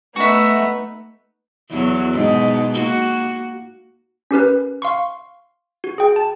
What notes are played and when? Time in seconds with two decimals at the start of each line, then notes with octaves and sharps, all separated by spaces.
0.16 A3 B3 D#4 F#4 E5
1.70 E2 F#3 F#4
2.13 G#2 B2
2.73 A#3 F#4
4.31 C#4 G4 A#4 B4
4.82 F5 C6 C#6
5.84 F#4
5.98 G#4 G5
6.16 A5